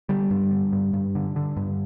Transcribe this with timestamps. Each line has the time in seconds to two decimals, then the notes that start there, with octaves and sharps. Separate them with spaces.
0.09 D3 G3
0.31 G2
0.51 D3
0.73 G2
0.93 G2
1.15 D3
1.36 D3
1.57 G2